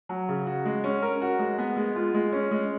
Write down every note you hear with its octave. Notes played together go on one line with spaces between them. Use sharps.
F#3
C#3
F#4
G#3
C#4
A#4
F#4
G#3
B3
G#3
F4
G#3
C#4
G#3